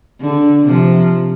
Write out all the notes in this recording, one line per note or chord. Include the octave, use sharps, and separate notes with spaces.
D3
C3 F3